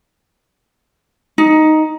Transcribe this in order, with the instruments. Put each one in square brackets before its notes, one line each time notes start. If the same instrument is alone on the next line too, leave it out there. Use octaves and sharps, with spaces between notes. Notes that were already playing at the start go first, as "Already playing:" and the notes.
[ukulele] D#4